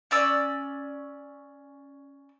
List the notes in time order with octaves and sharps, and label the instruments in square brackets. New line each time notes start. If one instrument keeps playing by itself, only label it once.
[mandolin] C#4 D5 E6